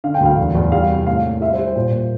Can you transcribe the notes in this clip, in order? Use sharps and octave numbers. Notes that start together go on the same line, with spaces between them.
D3 F5
G5
D2
F5
E2
E2
G3 F5
C3
A2 F5
A#3
G3 E5
C5
G3
C5
A#2 C5
A#3